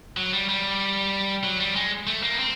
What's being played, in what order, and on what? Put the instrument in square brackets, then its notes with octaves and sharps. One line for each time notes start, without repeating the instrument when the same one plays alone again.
[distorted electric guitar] F#3
G3
G3
F#3
G3
G#3
A3
A#3
B3
C4